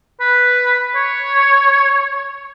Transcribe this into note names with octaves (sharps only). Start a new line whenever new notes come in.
B4
C#5